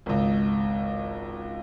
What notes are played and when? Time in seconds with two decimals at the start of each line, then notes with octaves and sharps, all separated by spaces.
0.06 G#1 C#2